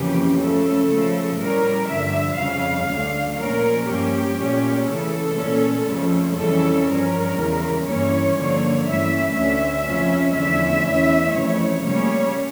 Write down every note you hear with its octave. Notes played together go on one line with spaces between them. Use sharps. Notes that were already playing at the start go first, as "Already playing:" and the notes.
Already playing: F2 C#3 E3 A#3 C#4 G4
C#3 F3 A3 C#4 A4
C#3 F3 A3
A2 G3 C#4 A#4
G2 D3 F3 E5
F2 C#3 G3 C#4 F5
D2 D3 A3
A#2 F3 C#4 A#4
G2 F3 A#3 C#4 G4
A#2 A3 C#4
C#3 E3 A3 A4
A#2 A3 C#4
F2 C#3 F3 A3 C#4
F2 C#3 E3 G3 C#4 A4
G2 F3 C#4 A#4
E2 C#3 E3 G3
G2 E3 A#3 C#4 C#5
G2 D3 F3 A#3
G2 E3 A3 C#4 E5
D2 D3 A3 C#4 E5
F2 C#3 F3 C#4
E2 D3 F3 A3 C#4 E5
E2 E3 A3 C#4
F2 C#3 E3 A3 C#5
C#3 G3 A#3 C#4 C#5